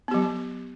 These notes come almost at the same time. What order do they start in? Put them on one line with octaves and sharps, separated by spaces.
B3 G4 F#3